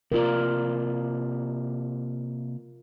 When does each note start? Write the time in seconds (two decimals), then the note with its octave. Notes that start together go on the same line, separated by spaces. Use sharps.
0.12 C3 A#3 F4 A#4 D5